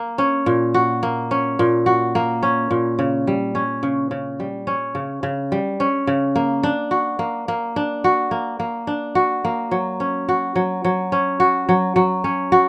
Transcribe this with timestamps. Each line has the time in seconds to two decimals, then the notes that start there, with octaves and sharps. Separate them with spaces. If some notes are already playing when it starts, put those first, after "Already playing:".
Already playing: A#3
0.18 C#4
0.46 A#2
0.74 F#4
1.03 A#3
1.31 C#4
1.59 A#2
1.86 F#4
2.15 A#3
2.43 C#4
2.71 A#2
2.99 C#3
3.27 G3
3.55 C#4
3.83 C#3
4.11 C#3
4.40 G3
4.67 C#4
4.95 C#3
5.23 C#3
5.52 G3
5.80 C#4
6.07 C#3
6.36 A#3
6.63 D4
6.91 F#4
7.19 A#3
7.48 A#3
7.76 D4
8.04 F#4
8.31 A#3
8.60 A#3
8.87 D4
9.15 F#4
9.45 A#3
9.71 F#3
10.00 C#4
10.29 F#4
10.56 F#3
10.84 F#3
11.12 C#4
11.40 F#4
11.69 F#3
11.96 F#3
12.24 C#4
12.52 F#4